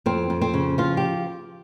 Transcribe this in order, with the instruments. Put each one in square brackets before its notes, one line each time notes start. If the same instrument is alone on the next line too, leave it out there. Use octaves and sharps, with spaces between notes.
[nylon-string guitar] F2 C4
F2
C4
C#3
F3 F4
G4